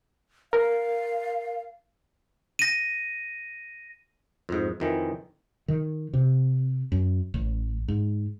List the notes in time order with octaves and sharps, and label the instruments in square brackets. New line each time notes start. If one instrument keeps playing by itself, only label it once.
[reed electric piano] A#4 [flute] F5
[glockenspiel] A#6 D#7
[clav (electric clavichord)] F2 G#2
F2 D#3 E3
[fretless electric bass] D#3
C3
F#2
A1
G#2